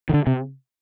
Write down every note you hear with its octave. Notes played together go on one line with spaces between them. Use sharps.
D#3
D3
C3